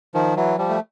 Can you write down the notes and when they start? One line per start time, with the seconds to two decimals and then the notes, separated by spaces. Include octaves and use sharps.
0.14 D#3 F3
0.36 E3 F#3
0.58 F3 G3
0.69 A3